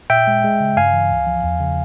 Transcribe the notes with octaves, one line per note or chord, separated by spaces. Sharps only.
A#2 E5 G5
G#3
G#3
C#3
G2 F5 G#5
E3
C#2
F3
E2
C#3